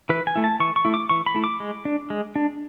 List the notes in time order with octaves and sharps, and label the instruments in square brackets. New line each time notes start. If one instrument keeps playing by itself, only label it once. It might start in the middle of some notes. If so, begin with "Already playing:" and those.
[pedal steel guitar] E3 B4
G#5
A3 E4
A5
E3 C#6
C#6
A3 E4
D6
E3 C#6
B5
A3 E4
D6
G#3
D4
G#3
D4